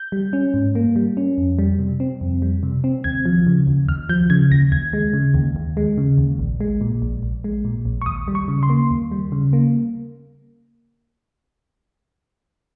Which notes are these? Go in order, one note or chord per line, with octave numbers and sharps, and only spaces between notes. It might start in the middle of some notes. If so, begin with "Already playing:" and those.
Already playing: G6
G3
C#4
G#2
A#3
G3
C#4
F2
G3
C3
C4
F2
G3
C3
C4
D#2 G#6
F3
C#3
D#2
D#2 F6
F3 G6
C#3 G#6
D#2 A#6
D#2 G#6
G#3
C#3
D#2
D#2
G#3
C#3
D#2
A#1
G#3
A#2
A#1
A#1
G#3
A#2
A#1
C#6
D#2 D#6
G3
C#6
C#3
C6
A#3
D#2
G3
C#3
A#3